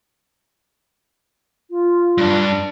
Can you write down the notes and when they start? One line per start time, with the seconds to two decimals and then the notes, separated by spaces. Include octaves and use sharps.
1.70 F4
2.18 G2 D4